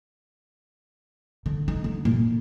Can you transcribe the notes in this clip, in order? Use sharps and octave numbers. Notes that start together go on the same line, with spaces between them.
D3
D#4
D3
A#2